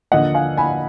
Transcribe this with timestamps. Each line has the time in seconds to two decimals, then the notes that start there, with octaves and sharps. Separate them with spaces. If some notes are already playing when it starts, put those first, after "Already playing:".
0.12 D#2 D3 F3 A#3 D#5 F#5
0.34 F5 G#5
0.57 G#5 B5